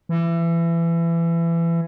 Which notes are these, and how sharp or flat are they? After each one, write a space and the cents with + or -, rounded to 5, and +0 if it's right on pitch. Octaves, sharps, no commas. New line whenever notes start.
E3 +25